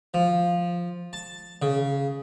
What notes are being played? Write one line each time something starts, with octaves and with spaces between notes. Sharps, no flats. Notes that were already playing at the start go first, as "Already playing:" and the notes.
F3
A5
C#3